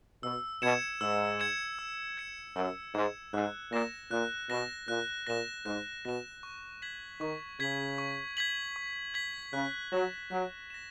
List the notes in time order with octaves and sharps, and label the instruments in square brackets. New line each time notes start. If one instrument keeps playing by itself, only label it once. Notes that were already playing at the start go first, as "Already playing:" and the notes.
[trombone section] B2 [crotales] E6
[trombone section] B2 [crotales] G#6 C#7 E7
[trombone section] G#2 [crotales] E6
[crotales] G#6 C#7 E7
E6
G#6 C#7 E7
[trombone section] F#2 [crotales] E6
[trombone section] G#2 [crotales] G#6 C#7 E7
[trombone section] G#2 [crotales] F#6
[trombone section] A#2 [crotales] A#6 E7
[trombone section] A#2 [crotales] F#6
[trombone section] B2 [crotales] A#6 E7
[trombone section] A#2 [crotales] F#6
[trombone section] A#2 [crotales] A#6 E7
[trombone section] G#2 [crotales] F#6
[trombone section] B2 [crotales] A#6 E7
[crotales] C#6
G#6 B6 F#7
[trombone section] D#3 [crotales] C#6
[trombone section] C#3 [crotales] G#6 B6 F#7
[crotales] C#6
G#6 B6 F#7
C#6
G#6 B6 F#7
[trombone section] C#3 [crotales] F#6
[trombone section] F#3 [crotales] A#6 E7
[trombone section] F#3 [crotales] F#6
[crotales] A#6 E7